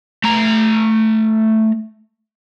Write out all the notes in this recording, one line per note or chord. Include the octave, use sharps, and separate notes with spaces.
A3 A#5